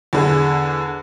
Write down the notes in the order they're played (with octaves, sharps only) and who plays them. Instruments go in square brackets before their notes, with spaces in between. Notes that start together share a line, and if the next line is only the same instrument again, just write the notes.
[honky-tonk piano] E2 D3 G#4